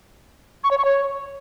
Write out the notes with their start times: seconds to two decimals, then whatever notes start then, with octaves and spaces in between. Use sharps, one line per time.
0.64 C#6
0.71 C#5
0.78 C#6
0.85 C#5